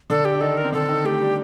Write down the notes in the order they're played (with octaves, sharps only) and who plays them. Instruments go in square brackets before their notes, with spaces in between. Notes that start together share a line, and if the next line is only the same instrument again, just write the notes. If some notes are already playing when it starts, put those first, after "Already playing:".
[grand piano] D3 D4 [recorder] A4
[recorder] G4
[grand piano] D4
[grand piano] D#3 D#4 [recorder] A4
[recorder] A#4
[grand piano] C4
[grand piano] D3 D4 [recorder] A4
[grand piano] D#3 D#4
[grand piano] A3 [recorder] G4
[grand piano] G3